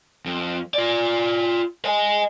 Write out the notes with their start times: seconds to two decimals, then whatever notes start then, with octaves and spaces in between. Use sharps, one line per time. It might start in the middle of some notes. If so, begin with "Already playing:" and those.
0.26 F2
0.74 F4 D5
1.85 D#5 G#5